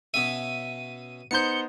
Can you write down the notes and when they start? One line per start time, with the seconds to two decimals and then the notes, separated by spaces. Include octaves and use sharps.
0.14 B2 C#4 E5 D#7
1.31 B3 D#4 C5 G6 C#7